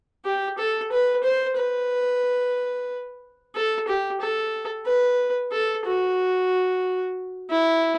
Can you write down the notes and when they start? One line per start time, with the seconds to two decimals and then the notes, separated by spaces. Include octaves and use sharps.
0.25 G4
0.58 A4
0.92 B4
1.24 C5
1.57 B4
3.55 A4
3.88 G4
4.21 A4
4.86 B4
5.52 A4
5.86 F#4
7.50 E4